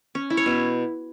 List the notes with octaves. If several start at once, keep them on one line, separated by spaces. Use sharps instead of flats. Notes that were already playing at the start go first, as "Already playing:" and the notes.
C#4
E4
C#5
B2